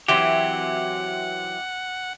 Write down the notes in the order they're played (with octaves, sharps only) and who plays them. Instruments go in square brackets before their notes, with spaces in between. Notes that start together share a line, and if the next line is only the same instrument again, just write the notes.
[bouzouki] E3 F#3 C4 [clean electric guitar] G4 [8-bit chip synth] F#5